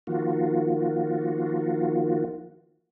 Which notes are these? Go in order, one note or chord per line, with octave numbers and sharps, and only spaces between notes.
D#3 F3 A#3 F4 F#4